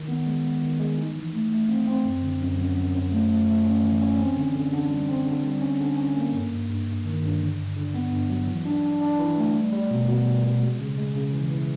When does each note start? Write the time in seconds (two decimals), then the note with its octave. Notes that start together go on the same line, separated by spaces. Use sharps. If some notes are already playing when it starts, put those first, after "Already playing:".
Already playing: D#3
0.08 B3
0.26 G#3
0.44 B3
0.62 D#3
0.80 G#3
0.98 D#4
1.16 E3
1.33 A3
1.51 A3
1.69 C4
1.87 C4
2.05 F#2
2.23 D3
2.40 F#2
2.58 F#2
2.76 F#2
2.94 F#2
3.12 A3
3.30 A3
3.48 A3
3.65 C#4
3.83 E3
4.01 C#4
4.19 C4
4.37 D3
4.55 D3
4.73 D3
4.90 G3
5.08 C4
5.26 D3
5.44 G3
5.62 C#4
5.80 D3
5.98 C#4
6.15 A#3
6.34 G2
6.51 G2
6.69 G2
6.87 G2
7.05 D#3
7.23 G2
7.41 D3
7.58 G2
7.76 D3
7.94 B3
8.12 G2
8.29 F#3
8.47 E3
8.65 D4
8.83 D4
9.01 D4
9.19 E3
9.36 A3
9.55 G3
9.72 G3
9.91 B2
10.09 B2
10.26 G3
10.44 B2
10.62 G#3
10.80 C#3
10.98 G#3
11.16 C#3
11.33 E3
11.51 E3